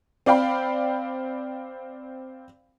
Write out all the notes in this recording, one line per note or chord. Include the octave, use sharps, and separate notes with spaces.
C4 D5 F5 G5 B5